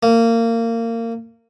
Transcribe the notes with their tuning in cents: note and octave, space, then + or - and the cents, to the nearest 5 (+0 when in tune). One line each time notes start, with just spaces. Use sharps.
A#3 -25